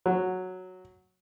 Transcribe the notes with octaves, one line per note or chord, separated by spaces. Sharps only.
F#3